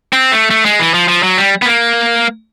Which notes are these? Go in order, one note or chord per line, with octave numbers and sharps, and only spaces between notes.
C4
A3
A3
G#3
E3
F3
F3
F#3
G3
B3
A#3